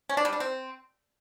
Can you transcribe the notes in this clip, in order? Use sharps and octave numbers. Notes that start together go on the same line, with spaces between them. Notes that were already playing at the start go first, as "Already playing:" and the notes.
C#4
D4
G3
D4
C4